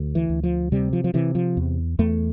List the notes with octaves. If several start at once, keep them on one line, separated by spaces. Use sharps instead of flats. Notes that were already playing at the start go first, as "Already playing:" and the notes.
Already playing: D2
E3
D2
F3
C3 G3
F3
F3
C3 E3
F3
E2
E2 A3